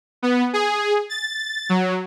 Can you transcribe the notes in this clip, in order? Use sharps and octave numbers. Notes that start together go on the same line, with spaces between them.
B3
G#4
A6
F#3